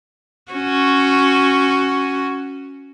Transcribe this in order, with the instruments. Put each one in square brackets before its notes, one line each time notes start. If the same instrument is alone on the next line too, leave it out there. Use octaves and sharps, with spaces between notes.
[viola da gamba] C#4 F#4